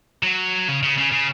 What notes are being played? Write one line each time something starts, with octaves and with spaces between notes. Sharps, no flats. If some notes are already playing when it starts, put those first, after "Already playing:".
F#3
C#3
C#3
C#3
C#3